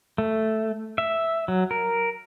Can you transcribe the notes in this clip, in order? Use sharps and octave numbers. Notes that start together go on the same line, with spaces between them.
A3
E5
F#3
A#4